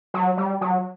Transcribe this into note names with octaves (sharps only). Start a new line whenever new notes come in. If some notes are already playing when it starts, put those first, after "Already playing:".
F#3
G3
F#3